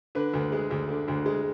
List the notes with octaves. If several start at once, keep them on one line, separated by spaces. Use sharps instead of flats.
D3 B4
D2
G#3
D2
D3
D2
G#3